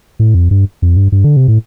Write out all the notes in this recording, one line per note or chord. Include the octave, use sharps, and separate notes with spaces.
A2
F2
G2
F2
G2
G2
D3
C3
A2